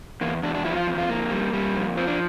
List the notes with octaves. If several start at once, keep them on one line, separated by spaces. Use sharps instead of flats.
E2 A#3
E2 D4
D4
F3 E4
F4
E2
F4
F2 A#3
G3
G3
F2
F3 C4
D4